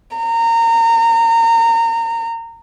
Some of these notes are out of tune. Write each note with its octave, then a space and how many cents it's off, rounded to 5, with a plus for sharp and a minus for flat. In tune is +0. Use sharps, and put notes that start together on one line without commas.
A#5 -25